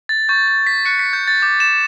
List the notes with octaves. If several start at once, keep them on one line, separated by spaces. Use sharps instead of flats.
A6
C#6 G6 A6
A6
B6
C#6 F#6 C#7
B6
G6
A6
D6 G6
E7